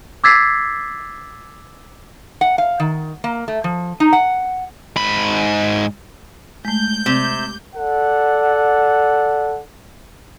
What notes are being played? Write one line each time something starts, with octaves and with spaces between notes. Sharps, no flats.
D6 E6 G#6 A6 B6 C7
F#5
F5
D#3
A#3
A3
F3
D#4
F#5
G#2 B5
G#3 A3 G6
C3
A4 D5 F#5